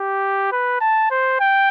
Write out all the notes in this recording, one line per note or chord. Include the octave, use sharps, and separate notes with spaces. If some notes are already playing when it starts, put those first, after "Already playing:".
Already playing: G4
B4
A5
C5
G5